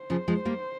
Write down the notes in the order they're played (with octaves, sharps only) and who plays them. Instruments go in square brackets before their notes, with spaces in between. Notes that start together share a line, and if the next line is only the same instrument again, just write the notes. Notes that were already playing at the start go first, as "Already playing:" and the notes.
Already playing: [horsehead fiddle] C5
[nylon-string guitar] C#3 F3
F3 G#3
G3 A#3